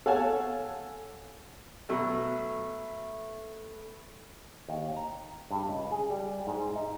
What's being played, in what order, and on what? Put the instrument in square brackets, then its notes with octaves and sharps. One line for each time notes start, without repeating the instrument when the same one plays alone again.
[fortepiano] A4 C#5 F5 F#5 G#5 A5
[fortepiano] B2 F#3 [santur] A3 B4
[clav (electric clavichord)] D#2
A#5
G2
C#2
G#4
G3
G#2
D#4